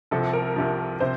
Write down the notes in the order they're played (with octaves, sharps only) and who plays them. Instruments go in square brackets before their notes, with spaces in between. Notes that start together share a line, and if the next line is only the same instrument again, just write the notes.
[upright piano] C2 C3 F3 [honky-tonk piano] A4
[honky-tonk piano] A#4
[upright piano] C2 C3 F3
[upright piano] C3 [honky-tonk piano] C5